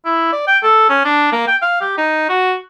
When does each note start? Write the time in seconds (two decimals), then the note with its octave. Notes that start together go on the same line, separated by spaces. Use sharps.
0.05 E4
0.33 D5
0.47 G5
0.63 A4
0.90 C#4
1.05 D4
1.32 A#3
1.48 G5
1.62 F5
1.81 G4
1.98 D#4
2.29 F#4